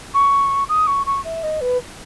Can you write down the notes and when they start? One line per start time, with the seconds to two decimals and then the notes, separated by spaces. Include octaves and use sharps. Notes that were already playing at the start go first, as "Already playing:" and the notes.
0.14 C#6
0.69 D#6
0.87 C#6
1.06 C#6
1.25 E5
1.43 D#5
1.61 B4